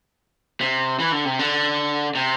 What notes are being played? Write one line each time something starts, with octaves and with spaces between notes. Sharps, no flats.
C3
E3
D3
C3
D3
C3